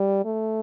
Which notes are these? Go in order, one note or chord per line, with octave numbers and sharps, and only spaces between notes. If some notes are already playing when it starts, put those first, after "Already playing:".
Already playing: G3
A3